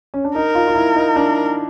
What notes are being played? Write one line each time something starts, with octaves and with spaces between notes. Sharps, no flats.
C#4
D4
D#4 A#4
F4
F4
E4
D#4
D4